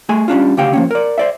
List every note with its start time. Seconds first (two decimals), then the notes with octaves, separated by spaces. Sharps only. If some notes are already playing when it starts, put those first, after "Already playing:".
0.09 A3 G#4 G#5
0.28 G3 C#4 D4 F4
0.57 D2 C#3 G4 F5 G5
0.73 F3 A#3 C#4
0.91 A#4 D5
1.18 C5 D5 E5